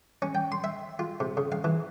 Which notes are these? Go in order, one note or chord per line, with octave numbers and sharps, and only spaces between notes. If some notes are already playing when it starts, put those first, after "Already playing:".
C#4
G5
C6
E5
F4
C3
C#3
F5
E3